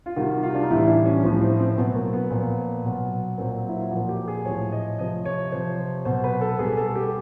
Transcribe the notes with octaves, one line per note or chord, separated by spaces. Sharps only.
F4
C3 D#3 G3 F#4
F4
D4
D#4
A2 E3 G3 E4
D4
C#4
A2 F3
C4
C4
B2 F#3 B3
A#3
B3
A#2 F3
B2 F#3
A#2 F#3 C4
E4
F4
A#2 F3 F#4
G4
G#4
A2 F3 C#5
D#5
C3 F3 D#5
C#5
C3 F3 C5
B2 F#3 C5
B4
A4
B2 G3 G#4
A4
G4